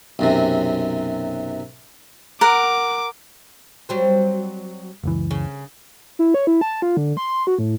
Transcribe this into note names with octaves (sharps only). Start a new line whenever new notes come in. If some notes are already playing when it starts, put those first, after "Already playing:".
B1 F#2 C3
A#4 F#5 D6
F#3 G3 C4
F#1 C#2 E3
C#3
E4
C#5
E4
A5
F4
D3
C6
F#4
A2